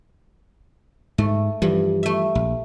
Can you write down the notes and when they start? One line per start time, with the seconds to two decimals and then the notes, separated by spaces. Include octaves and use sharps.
1.18 G#2 A3
1.62 G2 E3 F3 G3
2.03 A3 E5
2.35 A#1